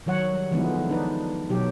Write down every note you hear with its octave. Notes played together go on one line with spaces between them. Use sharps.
D#3 F#3 C#5 F#5
G3
D3 E3 F3 G#3 B3 D#4
D4 D#4 B4
B2 F#3 D#4 G4